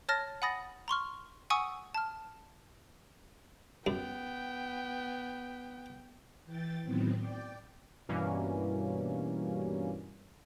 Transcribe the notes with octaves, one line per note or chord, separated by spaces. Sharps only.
C#5 A5 F6 A6 A#6
F#5 G#5 B5 D#6 A6 A#6
A#5 C6 C#6 F6
F#5 G#5 C#6 D#6 E6
A5 F6
F#2 B3 G5
E3 G5 A6
A2 D#3 F#3 B3 C4
D5 G5
G2 B2 E3 G3 A#3 C#4